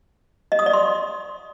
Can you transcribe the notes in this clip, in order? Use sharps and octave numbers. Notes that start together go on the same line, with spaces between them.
D#5
D#6
D5
C6